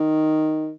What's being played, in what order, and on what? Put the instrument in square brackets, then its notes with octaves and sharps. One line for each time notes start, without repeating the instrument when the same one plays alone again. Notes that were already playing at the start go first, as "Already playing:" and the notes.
Already playing: [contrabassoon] D#3